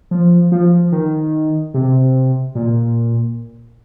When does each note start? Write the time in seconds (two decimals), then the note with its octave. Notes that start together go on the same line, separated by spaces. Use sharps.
0.11 F3
0.52 F3
0.92 D#3
1.74 C3
2.55 A#2